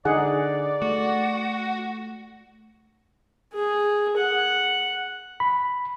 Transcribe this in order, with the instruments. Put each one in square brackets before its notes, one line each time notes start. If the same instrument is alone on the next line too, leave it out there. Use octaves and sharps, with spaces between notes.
[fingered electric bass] D3 [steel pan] D#4 G#4 F#5 [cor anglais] D5
[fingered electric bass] A3 [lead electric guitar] F#4
[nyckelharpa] G#4
F#5
[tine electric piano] B5